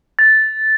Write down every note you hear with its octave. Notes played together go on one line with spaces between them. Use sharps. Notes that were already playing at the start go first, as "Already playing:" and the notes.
A6